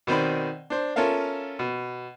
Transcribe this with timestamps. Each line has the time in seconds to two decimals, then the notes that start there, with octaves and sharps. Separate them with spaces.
0.07 B2 D#3 C4 D5 B5
0.70 D4 C5
0.96 C#4 F4 A4 A#4 E5 F5
1.59 B2